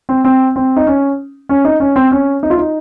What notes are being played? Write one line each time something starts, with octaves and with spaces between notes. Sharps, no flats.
C4
C4
C4
D#4
C#4
C#4
D#4
C#4
C4
C#4
D#4
F4
D#4